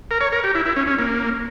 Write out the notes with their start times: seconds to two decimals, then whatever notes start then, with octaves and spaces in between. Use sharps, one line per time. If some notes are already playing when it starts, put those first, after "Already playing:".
0.11 A#4
0.21 C#5
0.32 A#4
0.44 G4
0.55 E4
0.66 E4
0.76 C#4
0.87 C#4
0.99 A#3